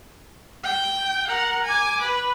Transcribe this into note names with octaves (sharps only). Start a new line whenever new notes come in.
G5
A#4 F#5
G#5 D6
B4